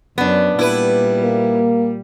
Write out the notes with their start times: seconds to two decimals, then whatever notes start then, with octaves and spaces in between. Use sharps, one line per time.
0.18 F#2 B3 D4
0.59 A#2 G3 E4 B4
1.22 A#3